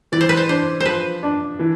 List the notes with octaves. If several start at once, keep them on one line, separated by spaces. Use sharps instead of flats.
E3 D5
C5
B4
C5
D4 C5
C5
F3 B4
D4
E3